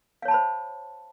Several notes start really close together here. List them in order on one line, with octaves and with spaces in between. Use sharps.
F5 C#5 A5 B5 C5